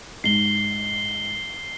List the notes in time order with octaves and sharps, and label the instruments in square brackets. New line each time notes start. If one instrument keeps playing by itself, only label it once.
[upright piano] G#2 [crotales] C7 G7